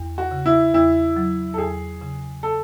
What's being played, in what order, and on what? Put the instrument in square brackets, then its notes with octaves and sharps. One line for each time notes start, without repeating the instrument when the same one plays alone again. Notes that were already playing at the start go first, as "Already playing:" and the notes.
Already playing: [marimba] E2
[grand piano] F#4
[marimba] C#3
[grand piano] E4
[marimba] E2 [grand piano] E4
[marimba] F#3
[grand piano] A4
[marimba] E2 [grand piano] G#4
[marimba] C#3
[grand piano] A4